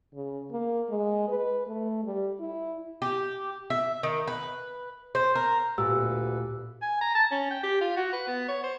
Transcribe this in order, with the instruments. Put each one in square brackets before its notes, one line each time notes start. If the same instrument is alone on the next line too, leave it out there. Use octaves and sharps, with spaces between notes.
[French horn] C#3
A#3
G#3
B4
A3
G3
E4
[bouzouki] G4
E5
D#3
B4
C5
A#4
[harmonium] D2 A4 B4 [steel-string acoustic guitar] A#2 [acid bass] G4 [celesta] E6
[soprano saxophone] G#5
A#5
A5
C#4
G5
G4
F4
F#4
B4
B3
C#5
C5